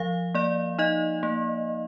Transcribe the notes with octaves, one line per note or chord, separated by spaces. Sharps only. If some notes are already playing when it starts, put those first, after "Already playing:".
Already playing: F3 F5
A#3 D5
D#4 D#5
A#3